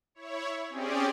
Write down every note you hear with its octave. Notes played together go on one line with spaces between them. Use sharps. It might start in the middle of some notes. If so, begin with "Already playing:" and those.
E4 C#5
C4 C#4 G4 G#4 D5